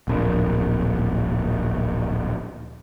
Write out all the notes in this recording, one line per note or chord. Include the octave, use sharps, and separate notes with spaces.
D1 A#1